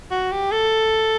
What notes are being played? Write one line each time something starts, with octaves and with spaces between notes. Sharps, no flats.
F#4
G4
A4